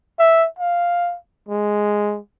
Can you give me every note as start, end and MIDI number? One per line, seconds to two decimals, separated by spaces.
0.20 0.47 76
0.59 1.16 77
1.49 2.19 56